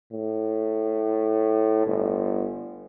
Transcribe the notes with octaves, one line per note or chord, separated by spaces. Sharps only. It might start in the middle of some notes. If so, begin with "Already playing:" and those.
A2
G1